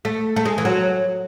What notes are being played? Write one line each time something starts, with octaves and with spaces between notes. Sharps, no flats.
A3
A3
G#3
E3
F#3